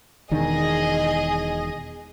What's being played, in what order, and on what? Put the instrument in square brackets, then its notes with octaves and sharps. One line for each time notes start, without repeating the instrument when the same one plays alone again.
[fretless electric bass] E1 D#3 D4 [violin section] G#4 D#5